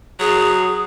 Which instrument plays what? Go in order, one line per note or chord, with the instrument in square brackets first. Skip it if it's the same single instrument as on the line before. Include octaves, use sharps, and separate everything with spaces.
[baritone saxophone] F#3 [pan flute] G#4